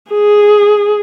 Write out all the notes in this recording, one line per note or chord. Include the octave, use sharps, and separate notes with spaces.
G#4